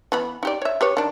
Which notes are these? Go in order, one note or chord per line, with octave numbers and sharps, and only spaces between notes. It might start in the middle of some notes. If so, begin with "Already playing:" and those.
E3 B3 B5
D#4 G4 D5
C#5 E5
G4 B4 C#5
D#3 D4